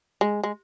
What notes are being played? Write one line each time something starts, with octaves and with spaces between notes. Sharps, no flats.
G#3
G#3